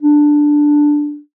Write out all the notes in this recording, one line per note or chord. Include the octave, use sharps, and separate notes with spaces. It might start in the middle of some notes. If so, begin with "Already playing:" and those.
D4